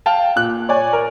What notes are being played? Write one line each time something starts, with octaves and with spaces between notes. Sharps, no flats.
F5 G5 A5
A#2 F#6
C#5 D5 G#5
A#4